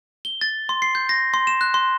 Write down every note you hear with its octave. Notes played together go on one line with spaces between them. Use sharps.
G7
A6
C6
C7
G6
A#6
C6
E7
F#6
C6